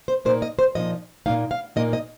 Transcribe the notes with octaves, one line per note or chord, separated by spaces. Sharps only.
C5
A#2 A#3 D#4 C5
D#5
C5
A#2 F3 D#4 D#5
A#2 A#3 D#4 F5
F5
A#2 A#3 D#4 D#5
D#5